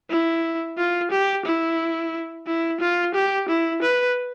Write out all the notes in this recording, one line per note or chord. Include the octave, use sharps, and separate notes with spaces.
E4
F4
G4
E4
E4
F4
G4
E4
B4